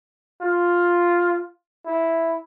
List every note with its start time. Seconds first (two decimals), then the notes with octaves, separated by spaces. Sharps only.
0.42 F4
1.87 E4